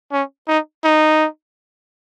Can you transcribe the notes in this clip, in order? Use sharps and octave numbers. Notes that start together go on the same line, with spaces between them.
C#4
D#4
D#4